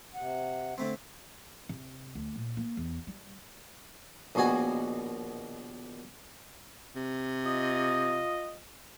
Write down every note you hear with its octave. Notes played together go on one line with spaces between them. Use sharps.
C3 F#5
D3 A3 C4
C3
D2
A#2
A#3
E2
G3
A#1 D#2 B2 F#4 G#5
C3
F4 D#5